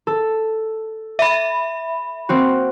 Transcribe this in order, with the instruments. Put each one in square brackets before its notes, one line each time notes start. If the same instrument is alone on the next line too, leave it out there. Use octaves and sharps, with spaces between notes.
[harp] A4
[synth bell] E5 B5
[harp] A#3 C4 F#4